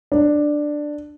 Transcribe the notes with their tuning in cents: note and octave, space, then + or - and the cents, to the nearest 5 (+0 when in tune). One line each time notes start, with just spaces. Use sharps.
D4 +10